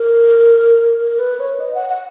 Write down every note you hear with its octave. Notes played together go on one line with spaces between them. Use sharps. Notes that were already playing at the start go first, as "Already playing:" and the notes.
Already playing: A#4
A#4
B4
C#5
D#5
F#5
F#5